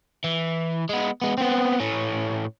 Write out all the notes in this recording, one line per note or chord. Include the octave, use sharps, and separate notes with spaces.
E3
G#3 B3
G#3 B3
B3 C4
A2 C#4